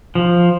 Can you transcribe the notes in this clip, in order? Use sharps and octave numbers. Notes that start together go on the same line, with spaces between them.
F3